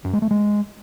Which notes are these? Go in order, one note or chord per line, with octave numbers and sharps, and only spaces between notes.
F#2
G#3
A3
G#3